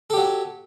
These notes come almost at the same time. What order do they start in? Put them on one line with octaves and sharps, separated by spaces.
A4 G4 F#3